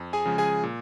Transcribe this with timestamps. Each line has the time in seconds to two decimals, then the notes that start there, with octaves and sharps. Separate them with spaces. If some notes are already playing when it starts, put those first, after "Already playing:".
Already playing: F2
0.13 G#4 G#5
0.26 C#3 F3 G#3
0.38 G#4 G#5
0.63 A#2